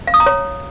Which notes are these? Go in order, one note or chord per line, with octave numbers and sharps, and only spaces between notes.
F5
D#6
A#5
C#5